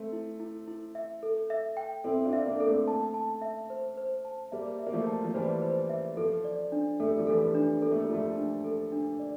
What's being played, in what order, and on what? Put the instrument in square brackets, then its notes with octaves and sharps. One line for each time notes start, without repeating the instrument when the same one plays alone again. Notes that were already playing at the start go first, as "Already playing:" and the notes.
Already playing: [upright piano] A3 C4 [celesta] A4
[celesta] E4
E4
E4
E5
A4
E5
G5
[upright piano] C4 E4 [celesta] A4
[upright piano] D4 F4
[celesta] E5
[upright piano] A#3 D4
[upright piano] D4 [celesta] A4
[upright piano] A3 C4
[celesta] A5
A5
E5
C5
C5
A5
[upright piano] G3 A#3 [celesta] E5
[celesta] E5
[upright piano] A#3
F3 A3
[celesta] A5
[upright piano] F3
[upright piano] E3 G3 [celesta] C5
[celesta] C5
E5
[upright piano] F3 [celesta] A4
[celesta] D5
D4
[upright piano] A3 [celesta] A4
[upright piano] G3
F3
[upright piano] E3 G3 [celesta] A4
[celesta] D4
[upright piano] A#3 [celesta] A4
[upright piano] A3
G3
[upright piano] F3 A3 [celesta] F4
[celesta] D4
A4
D4
D5